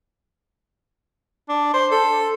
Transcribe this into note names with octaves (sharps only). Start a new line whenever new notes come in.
D4
C5
A4